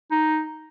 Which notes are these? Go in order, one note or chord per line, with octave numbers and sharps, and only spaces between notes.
D#4